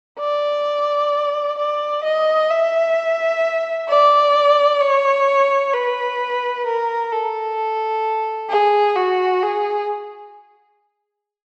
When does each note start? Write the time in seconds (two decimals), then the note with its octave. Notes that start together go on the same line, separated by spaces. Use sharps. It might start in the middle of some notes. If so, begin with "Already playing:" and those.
0.20 D5
1.58 D5
2.04 D#5
2.50 E5
3.89 D5
4.81 C#5
5.73 B4
6.66 A#4
7.12 A4
8.50 G#4
8.96 F#4
9.43 G#4